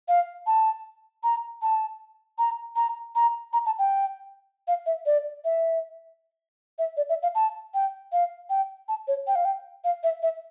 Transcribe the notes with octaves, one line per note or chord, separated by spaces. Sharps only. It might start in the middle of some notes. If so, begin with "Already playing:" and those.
F5
A5
A#5
A5
A#5
A#5
A#5
A#5
A5
G5
F5
E5
D5
E5
E5
D5
E5
F5
A5
G5
F5
G5
A5
C#5
G5
F5
G5
F5
E5
E5